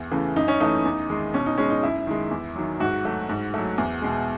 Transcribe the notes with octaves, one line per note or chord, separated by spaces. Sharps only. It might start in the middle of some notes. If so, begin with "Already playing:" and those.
Already playing: E2
C#3 E3 A3
F#2 D#4
C#4
E3 A3 D#4
E2
D#3 G#3
B2 C#4
D#4
G#3 C#4
D#4
F#2 E4
D#3 G#3
E2
D#3 F#3
G#2 F#4
F#3 A3
G#2
F#3 A3
E2
B2 G#3